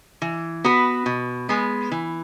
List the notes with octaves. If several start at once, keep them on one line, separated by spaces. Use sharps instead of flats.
E3
B3 F#4 B4
B2
G#3 B3
E3